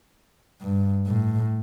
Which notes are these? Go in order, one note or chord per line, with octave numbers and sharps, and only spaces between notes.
G2
A2